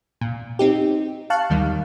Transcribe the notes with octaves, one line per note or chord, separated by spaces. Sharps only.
A#2
C4 D#4 G4
F5 A5 C#6 F#6
D#2 D#3 G3